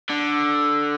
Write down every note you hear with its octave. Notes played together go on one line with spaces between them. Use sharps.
D3